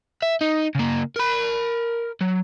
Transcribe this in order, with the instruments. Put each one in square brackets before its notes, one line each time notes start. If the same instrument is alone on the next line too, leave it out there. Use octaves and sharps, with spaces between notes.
[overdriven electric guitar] E5
D#4
C#3 A#3
A#4 B5
F#3